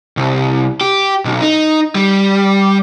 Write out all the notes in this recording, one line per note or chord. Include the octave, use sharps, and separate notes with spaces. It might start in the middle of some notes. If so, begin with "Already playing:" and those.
C2
G4
B1
D#4
G3